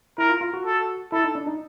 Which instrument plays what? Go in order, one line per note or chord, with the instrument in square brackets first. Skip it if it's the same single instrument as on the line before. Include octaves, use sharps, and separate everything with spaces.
[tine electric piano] E4 [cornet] A#4
[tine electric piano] F4
F4
F#4
[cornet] A4
[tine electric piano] E4 [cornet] A4
[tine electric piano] D#4
D4
D#4